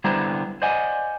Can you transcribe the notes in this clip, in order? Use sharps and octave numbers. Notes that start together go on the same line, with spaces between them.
D3 G3 B3 E4 C5 A#5
C5 D5 D#5 F#5 G#5